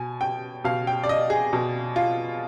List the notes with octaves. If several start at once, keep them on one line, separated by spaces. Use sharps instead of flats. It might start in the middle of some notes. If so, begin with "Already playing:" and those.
Already playing: B2 G#5
G5
B2 F5
G5
D5
D#5
G#4
B2
F4